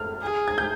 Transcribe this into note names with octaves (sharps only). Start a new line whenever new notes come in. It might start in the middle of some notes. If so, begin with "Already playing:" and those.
Already playing: F6
G#4
G#6
G6